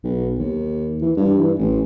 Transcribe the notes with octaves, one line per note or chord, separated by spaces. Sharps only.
B1
D#2
E3
G2
E3
A1